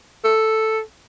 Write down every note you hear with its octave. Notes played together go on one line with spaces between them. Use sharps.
A4